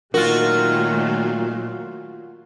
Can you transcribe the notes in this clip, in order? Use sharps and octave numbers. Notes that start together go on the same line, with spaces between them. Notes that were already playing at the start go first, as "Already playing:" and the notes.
A#2 D#3 F#3 A3 F4 F#4 A#4